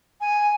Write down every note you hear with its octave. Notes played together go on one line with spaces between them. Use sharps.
G#5